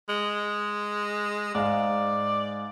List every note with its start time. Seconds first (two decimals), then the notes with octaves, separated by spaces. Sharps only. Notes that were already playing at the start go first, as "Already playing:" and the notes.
0.09 G#3
1.55 G#2 D5 F5